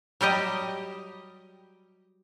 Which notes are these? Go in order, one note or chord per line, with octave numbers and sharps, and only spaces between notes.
F#3 G3 G4 D#5